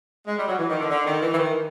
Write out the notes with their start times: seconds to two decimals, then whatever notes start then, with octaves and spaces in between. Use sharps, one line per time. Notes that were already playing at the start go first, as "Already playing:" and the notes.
0.27 G#3
0.38 G3
0.48 F#3
0.58 E3
0.69 D#3
0.79 D3
0.90 D3
1.06 D#3
1.21 E3
1.33 E3
1.38 D#3